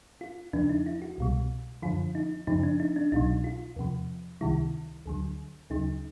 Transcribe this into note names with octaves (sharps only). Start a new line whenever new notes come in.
F4
E2 C#3 F3 D4
D#4
E4
F#4
C2 B2 G3
F#2 D3 F3 F4
D#4
F#2 C#3 F3 D#4
D4
D#4
D4
C2 B2 F#3 D#4
F4
E2 C3 F3
C#2 C3 D#3 G3 E4
D2 D3 F#3
D2 C#3 F#3 D#4